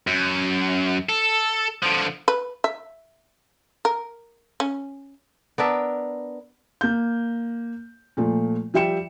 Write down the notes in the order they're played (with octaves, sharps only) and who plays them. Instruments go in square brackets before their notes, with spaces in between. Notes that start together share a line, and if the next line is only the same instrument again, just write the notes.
[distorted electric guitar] F#2
A4
D3 F3
[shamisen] B4
E5
A#4
C#4
[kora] B3 D4 A#4 E5
[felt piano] A#3 G6
A#2 F3 A3
F3 G3 E5 G5 C#7 E7